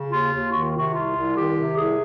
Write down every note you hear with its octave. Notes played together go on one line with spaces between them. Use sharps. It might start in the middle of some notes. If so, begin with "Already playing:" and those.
Already playing: C#3
D#2 F4
D#2
D#3 F#4
F4
C3 F#4
C2 F4
C2
D#3 G4
C3
C2 G#4